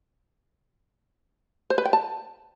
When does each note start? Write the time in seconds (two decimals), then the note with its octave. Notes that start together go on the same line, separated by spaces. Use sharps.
1.70 C5
1.78 B4
1.85 G5
1.93 A5